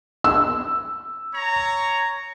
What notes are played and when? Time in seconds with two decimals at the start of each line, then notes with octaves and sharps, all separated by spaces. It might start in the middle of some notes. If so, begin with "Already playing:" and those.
0.24 E6
1.33 C#5 A#5